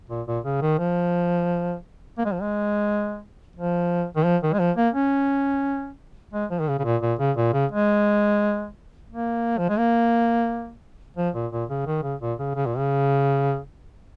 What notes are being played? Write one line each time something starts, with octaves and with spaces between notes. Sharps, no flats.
A#2
A#2
C#3
D#3
F3
A#3
G#3
F3
G#3
F3
D#3
F3
D#3
G#3
F3
A#3
C#4
G#3
F3
D#3
C#3
C#3
A#2
A#2
C#3
A#2
C#3
G#3
A#3
F3
G#3
A#3
F3
A#2
A#2
C#3
D#3
C#3
A#2
C#3
C#3
A#2
C#3